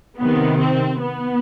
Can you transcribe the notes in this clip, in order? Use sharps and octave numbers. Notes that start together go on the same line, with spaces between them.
C3 D#3 B3
C4
B3